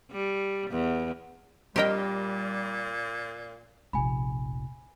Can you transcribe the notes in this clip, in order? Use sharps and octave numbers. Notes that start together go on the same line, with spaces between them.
G3
E2
A#2 G3 C4 G4 A#4 D#5 G5
F1 A#1 G#5 B5